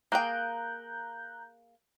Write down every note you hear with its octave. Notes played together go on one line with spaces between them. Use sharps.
A#3 G#4 G5 A#5 F#6 G6